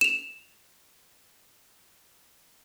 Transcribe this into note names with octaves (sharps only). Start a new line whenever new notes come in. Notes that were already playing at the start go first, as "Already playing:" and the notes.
E7 F7